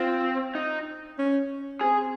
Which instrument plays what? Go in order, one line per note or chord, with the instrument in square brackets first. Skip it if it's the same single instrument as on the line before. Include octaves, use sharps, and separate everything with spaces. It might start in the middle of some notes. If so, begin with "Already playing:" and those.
Already playing: [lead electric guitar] C4 [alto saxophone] F4
[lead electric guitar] D#4
[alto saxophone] C#4
[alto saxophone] C4 [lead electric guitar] G#4